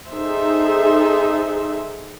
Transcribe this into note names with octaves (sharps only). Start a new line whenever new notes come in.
D#4 G#4 A4 C5 E5